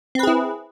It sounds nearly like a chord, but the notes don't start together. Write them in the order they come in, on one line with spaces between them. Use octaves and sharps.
C4 B4 G#4 E4